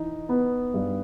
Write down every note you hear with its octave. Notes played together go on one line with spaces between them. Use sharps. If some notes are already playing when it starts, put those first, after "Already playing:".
Already playing: E3 D#4
B3
G2